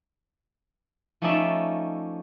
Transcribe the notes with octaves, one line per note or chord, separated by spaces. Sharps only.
F3 A3 C#4 D#4 D5 E5